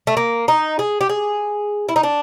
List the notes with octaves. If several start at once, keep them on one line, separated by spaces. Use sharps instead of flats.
A3
A#3
D#4
G#4
G4
G#4
E4
D#4
D4